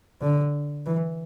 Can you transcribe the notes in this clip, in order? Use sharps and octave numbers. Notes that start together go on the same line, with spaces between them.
D3
E3